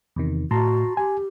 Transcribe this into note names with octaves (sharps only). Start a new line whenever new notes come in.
E2 C3 D#3
A2 F#4 A5 A#5 C6
G4 G#5